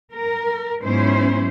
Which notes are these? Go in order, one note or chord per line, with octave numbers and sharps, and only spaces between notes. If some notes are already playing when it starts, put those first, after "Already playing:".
A#4
G#2 F#3 B3 C#4 E4 C5